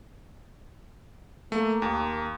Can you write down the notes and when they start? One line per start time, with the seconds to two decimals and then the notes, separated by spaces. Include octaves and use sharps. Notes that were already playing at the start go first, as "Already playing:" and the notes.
1.52 A3 A#3
1.82 D#2